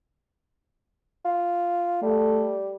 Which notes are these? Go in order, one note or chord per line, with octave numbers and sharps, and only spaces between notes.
F4
G3 A3